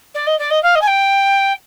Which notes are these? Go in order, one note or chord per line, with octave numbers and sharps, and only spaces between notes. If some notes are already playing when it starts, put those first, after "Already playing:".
D5
D#5
D5
D#5
F5
D#5
G#5
G5